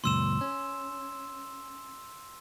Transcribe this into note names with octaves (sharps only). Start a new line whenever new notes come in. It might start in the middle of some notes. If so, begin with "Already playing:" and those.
C#2 F#2 A#2 C6 E6 E7
C#4